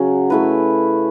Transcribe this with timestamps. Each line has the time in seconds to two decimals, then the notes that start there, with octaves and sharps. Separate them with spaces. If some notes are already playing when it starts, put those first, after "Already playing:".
Already playing: C#3 F#3 C#4
0.30 A3 E4 B4